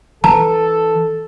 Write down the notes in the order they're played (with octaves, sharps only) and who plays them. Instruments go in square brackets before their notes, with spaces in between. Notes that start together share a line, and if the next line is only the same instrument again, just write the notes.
[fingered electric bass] E3 [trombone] A4 [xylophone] A5 A#5